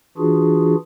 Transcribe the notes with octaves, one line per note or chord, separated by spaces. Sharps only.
E3 D4 F4 F#4 G#4